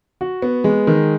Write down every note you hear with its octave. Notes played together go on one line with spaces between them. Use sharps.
F#4
B3
G#3
D#3